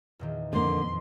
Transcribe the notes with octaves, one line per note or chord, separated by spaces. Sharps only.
E2 A#2 D#3
F2 D3 A#3 C6